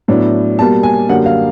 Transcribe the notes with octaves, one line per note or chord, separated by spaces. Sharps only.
A2 F#3 B3 D4
B2 G3 A#3 A5
G#5
F#2 D3 G3 A#3 F#5
F5